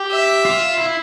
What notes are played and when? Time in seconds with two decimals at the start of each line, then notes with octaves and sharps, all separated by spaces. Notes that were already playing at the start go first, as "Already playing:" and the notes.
Already playing: G4
0.11 E5
0.45 F4
0.78 E4